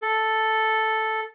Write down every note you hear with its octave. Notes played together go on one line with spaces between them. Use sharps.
A4